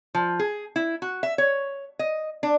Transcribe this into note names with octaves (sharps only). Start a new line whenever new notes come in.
F3
G#4
E4
F#4
E5
C#5
D#5
D4